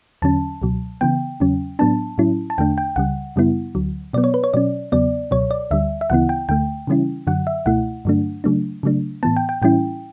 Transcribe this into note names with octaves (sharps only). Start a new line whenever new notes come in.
E2 D3 F#3 C#4 A5
C#2 B2 F#3
C#3 E3 B3 G5
E2 C#3 F#3 C#4
A2 F#3 B3 D4 A5
A2 F#3 C#4 E4
A5
E2 D3 A3 D4 G5
G5
C#2 C#3 G3 F#5
F#2 C#3 G3 B3 E4
D2 D3 F#3
B2 F#3 B3 D5
C#5
B4
C#5
B2 F#3 C#4 D5
E2 C#3 F#3 B3 D5
C#2 B2 F#3 C#5
D5
D2 D3 G3 E5
E5
D2 C#3 E3 B3 E4 F#5
G5
D2 D3 A3 G5
C#3 E3 G3 C#4 E4
F#2 D3 F#3 F#5
E5
C#2 B2 A3 E4 F#5
G2 D3 F#3 A3 D4
C#3 F#3 A3 D4
C#3 F#3 A3 D4
A2 E3 B3 A5
G5
G5
A2 E3 G3 C#4 E4 G5